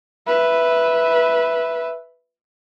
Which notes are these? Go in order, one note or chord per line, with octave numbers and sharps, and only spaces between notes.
B4 E5